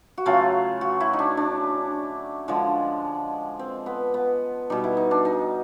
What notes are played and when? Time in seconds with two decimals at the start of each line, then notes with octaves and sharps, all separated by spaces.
0.18 F#4
0.26 C#3 F#3 A3 F4
0.81 F#4
1.00 E4
1.13 D#4
1.19 D4
1.37 D4
2.48 D3 F3 G#3
3.59 C4
3.86 B3
4.14 B3
4.70 B2 G3 D#4
4.84 E4
4.97 D#4
5.11 D4
5.25 D#4